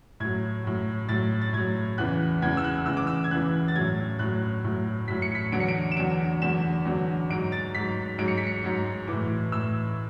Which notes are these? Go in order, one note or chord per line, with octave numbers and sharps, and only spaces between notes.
A2 F#3 G#6
A2 F#3
A2 F#3 A6
A6
A2 F#3 G#6
E2 C#3 E3 F#6
E2 C#3 E3 G#6
E6
F#6
E2 C#3 E3 E6
D6
E6
G#6
E2 C#3 E3 F#6
A6
A2 F#3 G#6
A2 F#3 F#6
A2 F#3
A2 F#3 B6
C#7
B6
E2 D3 F#3 D7
C#7
D7
E7
E2 D3 F#3 D7
E2 D3 F#3 E7
E2 D3 F#3
G#2 F#3 D7
A6
G#2 F#3 B6
G#2 F#3 D7
C#7
B6
C#7
G#2 F#3
E3 D6
A2
A2 E3 E6